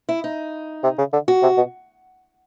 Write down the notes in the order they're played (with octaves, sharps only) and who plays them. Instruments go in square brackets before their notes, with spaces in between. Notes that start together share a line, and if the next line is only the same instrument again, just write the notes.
[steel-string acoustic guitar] E4
D#4
[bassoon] C3
C#3
D3
[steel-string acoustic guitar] F#4
[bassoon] C3
B2